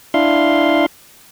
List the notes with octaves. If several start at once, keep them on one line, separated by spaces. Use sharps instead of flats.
D4 E4 F5 C6